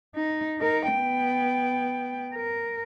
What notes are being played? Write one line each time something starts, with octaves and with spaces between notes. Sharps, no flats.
D#4
D#4 A#4
B3 G5
A#4